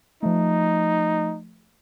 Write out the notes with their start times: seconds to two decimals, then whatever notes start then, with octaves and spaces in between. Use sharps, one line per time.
0.23 F3 A3 D#4